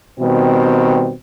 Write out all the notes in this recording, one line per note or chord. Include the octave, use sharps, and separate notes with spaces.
B2 D#3 G3 C4